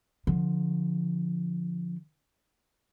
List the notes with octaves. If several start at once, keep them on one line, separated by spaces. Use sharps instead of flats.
D3 F3